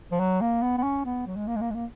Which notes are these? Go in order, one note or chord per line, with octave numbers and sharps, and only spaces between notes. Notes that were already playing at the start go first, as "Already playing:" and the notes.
F3
F#3
A#3
B3
B3
C#4
B3
F#3
G#3
A#3
G#3
A#3
G#3
A#3